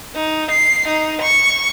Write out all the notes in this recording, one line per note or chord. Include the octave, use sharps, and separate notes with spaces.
D#4
C7
D#4
C#6